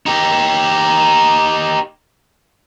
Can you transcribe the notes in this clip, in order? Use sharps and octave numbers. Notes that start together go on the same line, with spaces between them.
D#4 G4